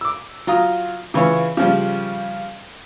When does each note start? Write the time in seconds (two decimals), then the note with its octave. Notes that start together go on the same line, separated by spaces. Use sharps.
0.01 D6 E6
0.47 F#3 F4 A#5 D#6
1.14 C#3 E3 F4 C#5
1.57 C#3 F3 G3